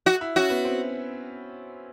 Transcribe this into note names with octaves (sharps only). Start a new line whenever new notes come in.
F#4
E4
C#4 F#4
B3
C4